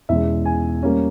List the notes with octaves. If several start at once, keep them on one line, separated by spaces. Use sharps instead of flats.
E2 B2 G#3 C#4 E5
G#5
G3 A#3 C#4